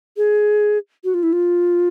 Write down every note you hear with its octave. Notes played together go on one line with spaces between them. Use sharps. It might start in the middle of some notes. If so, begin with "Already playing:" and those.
G#4
F#4
F4
E4
F4